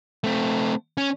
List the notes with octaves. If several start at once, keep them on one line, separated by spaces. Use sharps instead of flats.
A3 C4
C#4